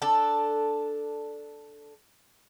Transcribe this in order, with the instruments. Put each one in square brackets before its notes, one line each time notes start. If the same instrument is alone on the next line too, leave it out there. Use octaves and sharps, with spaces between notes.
[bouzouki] D4 A4